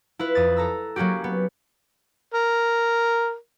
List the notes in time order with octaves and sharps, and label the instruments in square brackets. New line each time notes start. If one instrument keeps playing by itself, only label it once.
[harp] E4 F4 B4
F2 D#6 A6
A4 A#5 E6
F#3 A#3 C#4 F#4 G4
B3
[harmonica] A#4